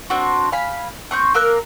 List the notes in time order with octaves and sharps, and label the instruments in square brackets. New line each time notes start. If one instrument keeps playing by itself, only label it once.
[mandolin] C4 D4 F#4
F5 G#5 B5
C4 C#6 G6
A#3 A#4 E6 F#6